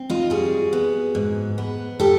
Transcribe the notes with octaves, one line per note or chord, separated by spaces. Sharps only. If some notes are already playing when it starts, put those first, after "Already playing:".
Already playing: C4
D#4 F4
G3 F#4 G#4
B3
G#2
B3
G3 G4 A4